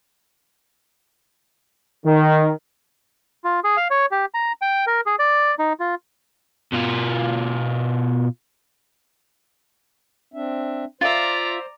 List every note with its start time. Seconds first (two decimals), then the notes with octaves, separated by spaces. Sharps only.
2.05 D#3
3.44 F4
3.64 G#4
3.77 F5
3.90 C#5
4.11 G4
4.34 A#5
4.62 G5
4.87 A#4
5.06 G#4
5.19 D5
5.59 D#4
5.80 F4
6.73 B2 F4
10.34 C4 D4 E5
11.01 F4 C5 D5 E5 A#5